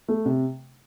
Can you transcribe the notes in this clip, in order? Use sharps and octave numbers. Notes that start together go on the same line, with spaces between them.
A3
C3